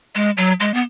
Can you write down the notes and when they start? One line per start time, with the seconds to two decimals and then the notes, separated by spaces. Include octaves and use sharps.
0.15 G#3
0.37 F#3
0.60 G#3
0.74 B3